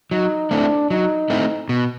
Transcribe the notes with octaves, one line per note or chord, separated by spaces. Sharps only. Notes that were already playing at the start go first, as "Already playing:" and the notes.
F#3 D#4
A3 C4 D4 E4
F#3 D#4
A3 C4 E4
B2